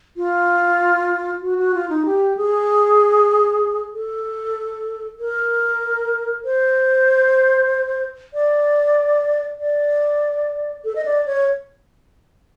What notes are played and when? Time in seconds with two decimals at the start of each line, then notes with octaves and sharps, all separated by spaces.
0.17 F4
1.42 F#4
1.58 F#4
1.74 F4
1.89 D#4
2.06 G4
2.37 G#4
3.94 A4
5.20 A#4
6.45 C5
8.34 D5
9.58 D5
10.85 A4
10.96 D#5
11.05 D5
11.26 C#5